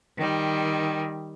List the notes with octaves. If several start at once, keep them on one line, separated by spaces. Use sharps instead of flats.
D#3 G3